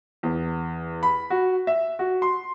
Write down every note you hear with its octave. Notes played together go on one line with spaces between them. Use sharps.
E2
B5
F#4
E5
F#4
C6